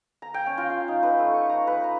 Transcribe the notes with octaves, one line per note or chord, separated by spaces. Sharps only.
A#5
G5
C#4
F4
F5
D#4
B4
A3
C#6
A#5
B4
A#5